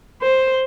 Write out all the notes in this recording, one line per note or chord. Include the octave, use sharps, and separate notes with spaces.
C5